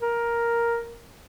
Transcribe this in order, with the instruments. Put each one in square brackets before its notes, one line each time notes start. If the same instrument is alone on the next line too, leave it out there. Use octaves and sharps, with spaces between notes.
[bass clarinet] A#4